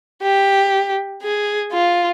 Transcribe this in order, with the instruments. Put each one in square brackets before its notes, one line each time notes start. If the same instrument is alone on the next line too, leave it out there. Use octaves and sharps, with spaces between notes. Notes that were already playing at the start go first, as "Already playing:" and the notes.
[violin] G4
G#4
F4